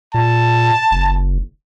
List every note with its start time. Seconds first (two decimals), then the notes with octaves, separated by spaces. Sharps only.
0.14 A#2 A5
0.91 F#1